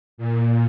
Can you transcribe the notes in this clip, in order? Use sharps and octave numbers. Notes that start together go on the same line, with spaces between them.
A#2